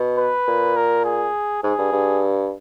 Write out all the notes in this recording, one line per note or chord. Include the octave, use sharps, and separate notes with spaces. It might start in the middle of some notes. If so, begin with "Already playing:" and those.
Already playing: B2
B4
A#2
A#4
G#4
G#2 G#4
G2
G2